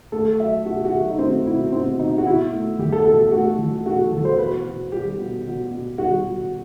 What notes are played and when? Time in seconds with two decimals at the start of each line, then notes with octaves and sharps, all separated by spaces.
0.12 A3 A4
0.39 F#3 E5
0.65 B2 F#4
0.76 G4
0.85 F#4
0.92 F#3
1.10 D#4
1.19 A3 C4
1.46 B2 E4
1.72 B2 C4
1.99 B2 D#4
2.18 F#4
2.25 B2 E4
2.53 A3
2.79 E2 G4
2.92 A4
3.05 B2 A4
3.19 G4
3.32 A3 F#4
3.58 E2
3.85 B2 F#4
4.12 E2 A4
4.25 C5
4.38 B2 B4
4.65 B2
4.92 G3 G4
5.18 B2
5.46 B2
5.71 B2
5.98 G3 F#4
6.26 G3